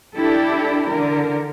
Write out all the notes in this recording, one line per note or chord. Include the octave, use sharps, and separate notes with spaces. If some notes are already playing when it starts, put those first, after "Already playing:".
D4 E4 G4 A4
D3 A#4